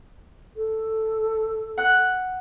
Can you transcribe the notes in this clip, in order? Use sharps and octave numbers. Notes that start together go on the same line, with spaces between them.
A4
F#5 F#6